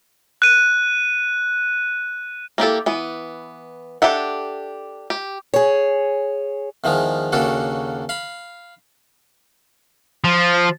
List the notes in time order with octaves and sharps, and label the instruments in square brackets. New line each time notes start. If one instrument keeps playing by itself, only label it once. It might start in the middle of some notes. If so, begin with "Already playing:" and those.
[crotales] F#6 D#7
[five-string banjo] A#3 E4 G4 A4
E3 B3
D4 G4 A4 E5 F#5
G4
[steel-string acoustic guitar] G#4 C#5
[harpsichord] E2 D#3 F3 G#3
D#2 C#3 A#3 D4 F#4 A4
F5 B5
[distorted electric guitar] F3